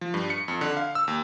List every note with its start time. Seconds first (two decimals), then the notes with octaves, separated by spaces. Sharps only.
0.01 F3
0.14 G2
0.30 C#7
0.48 F2
0.61 D3
0.77 F5
0.95 E6
1.08 D#2